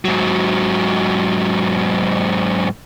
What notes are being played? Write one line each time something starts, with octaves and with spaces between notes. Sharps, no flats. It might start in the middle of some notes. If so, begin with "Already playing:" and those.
G#2 F#3